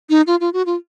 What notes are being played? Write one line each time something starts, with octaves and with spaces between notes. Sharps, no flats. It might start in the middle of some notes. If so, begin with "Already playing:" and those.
D#4
F4
F4
F#4
F4